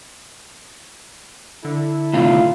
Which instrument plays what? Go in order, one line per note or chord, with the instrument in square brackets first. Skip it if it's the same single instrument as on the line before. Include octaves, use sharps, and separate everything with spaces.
[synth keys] D3 [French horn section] E4 A4
[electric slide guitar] A2 C3 D#3 [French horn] F4